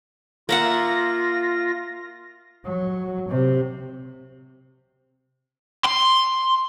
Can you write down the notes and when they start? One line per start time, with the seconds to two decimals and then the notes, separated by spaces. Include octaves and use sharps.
0.49 A#3 F4 E5 F#5 A#6
2.64 F#3
3.29 C3
5.85 C6